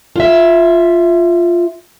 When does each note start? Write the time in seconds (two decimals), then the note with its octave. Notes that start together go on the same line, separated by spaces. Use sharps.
0.16 F4 E5